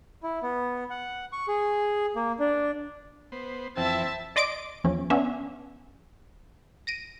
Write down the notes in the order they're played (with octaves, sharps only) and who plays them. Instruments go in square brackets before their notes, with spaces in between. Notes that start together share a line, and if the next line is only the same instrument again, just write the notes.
[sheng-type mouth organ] E4
B3
F#5
C#6
G#4
A#3
D4
[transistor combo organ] B3 C5
[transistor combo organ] F2 E3 E4 [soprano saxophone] C4 [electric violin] E5 A5
[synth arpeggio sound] D5 D#5 C6 D6 D7
E2 F3 C#4
B3 C#4 D4 E5
A#6 D7 D#7